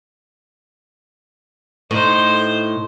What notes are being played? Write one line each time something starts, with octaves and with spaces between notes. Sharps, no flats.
A2 D#4 C5